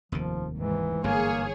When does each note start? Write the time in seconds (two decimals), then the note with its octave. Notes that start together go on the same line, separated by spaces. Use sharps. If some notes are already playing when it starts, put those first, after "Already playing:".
0.12 F1 D#2 D#3 F3
0.57 G#2 E3
1.04 G1 G#2 E3 A#3 G#4 C#5